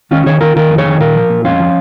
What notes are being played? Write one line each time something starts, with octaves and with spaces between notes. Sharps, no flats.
D#3 C#4 F4
D#3 G#4 C#5
D#3 F4 A#4
D#3 F4 A#4
F2
G#4 C#5
D#3
A#2 F4 A#4
F3
A#2
F2 C#4 F4
F3